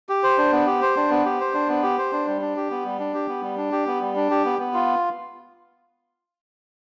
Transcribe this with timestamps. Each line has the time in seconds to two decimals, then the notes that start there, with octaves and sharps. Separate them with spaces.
0.09 G4
0.23 C5
0.38 D4
0.52 B3
0.66 G4
0.82 C5
0.96 D4
1.10 B3
1.25 G4
1.40 C5
1.54 D4
1.68 B3
1.83 G4
1.98 C5
2.12 D4
2.27 G3
2.41 D4
2.56 G4
2.70 B3
2.85 G3
3.00 D4
3.14 G4
3.28 B3
3.43 G3
3.57 D4
3.72 G4
3.87 B3
4.01 G3
4.16 D4
4.31 G4
4.45 B3
4.59 B3
4.74 F4